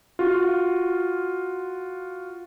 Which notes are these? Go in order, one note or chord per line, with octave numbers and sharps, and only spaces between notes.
F4 F#4